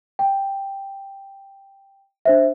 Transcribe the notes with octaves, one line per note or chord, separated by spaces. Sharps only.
G5
D4 C5 E5